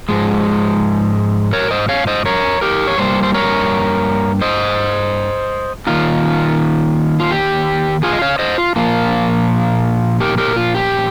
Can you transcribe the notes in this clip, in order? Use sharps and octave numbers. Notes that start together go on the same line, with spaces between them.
G#2 F3 G#3
A#4 C#5
C5 D#5
C#5 F5
C5 D#5
A#4 C#5
G4 A#4
C#5
G2 G3 A#3 C5
C5
A#4 C#5
C5 D#5
D#3 A#3 D#4 F4
F4
G4
F4 G#4
D#5
C#5 F5
C5 D#5
F4
A#2 F3 A#3 F4
G4 A#4
G4 A#4
F4
G4